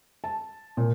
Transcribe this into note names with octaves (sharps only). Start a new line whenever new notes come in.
A5
A#2